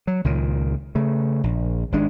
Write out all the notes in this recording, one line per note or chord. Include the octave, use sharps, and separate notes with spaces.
F#3
C#2 A#2 D#3
C#3 A3
A#1
G#1 G#2 G#3 D4